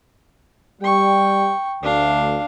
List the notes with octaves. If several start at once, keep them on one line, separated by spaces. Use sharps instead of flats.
G3 G5 C#6
D2 D4 F5